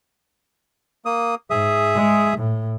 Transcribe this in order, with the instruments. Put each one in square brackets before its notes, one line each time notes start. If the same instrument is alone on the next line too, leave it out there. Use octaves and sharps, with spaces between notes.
[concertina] A#3 D#6
[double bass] G#2 [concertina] G#4 E5 D#6
[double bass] G#3
A2